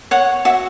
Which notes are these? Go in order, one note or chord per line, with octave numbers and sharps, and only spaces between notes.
C#5 F#5
F#4 E5